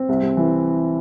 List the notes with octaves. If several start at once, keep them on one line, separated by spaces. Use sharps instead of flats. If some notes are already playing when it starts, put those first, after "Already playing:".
Already playing: C4
C2
C2
E3